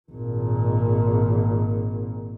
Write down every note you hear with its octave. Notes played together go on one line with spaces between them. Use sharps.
G#1 A#2